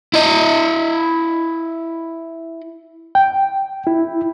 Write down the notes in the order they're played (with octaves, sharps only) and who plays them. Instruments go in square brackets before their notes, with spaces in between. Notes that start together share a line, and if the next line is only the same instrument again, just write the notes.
[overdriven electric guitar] E4 D#5
[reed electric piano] G5
E4